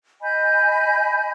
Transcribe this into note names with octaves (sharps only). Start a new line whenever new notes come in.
D#5 G#5 B5 G6